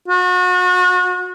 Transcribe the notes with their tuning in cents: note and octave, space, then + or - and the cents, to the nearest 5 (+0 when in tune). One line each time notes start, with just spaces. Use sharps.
F#4 -35